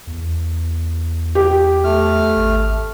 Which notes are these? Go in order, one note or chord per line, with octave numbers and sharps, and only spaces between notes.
E2
G4
A3 F6
G#1